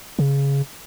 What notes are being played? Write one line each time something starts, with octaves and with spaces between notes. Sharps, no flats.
C#3